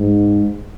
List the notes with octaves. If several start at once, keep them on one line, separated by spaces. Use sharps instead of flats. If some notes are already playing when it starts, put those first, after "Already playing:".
Already playing: G#2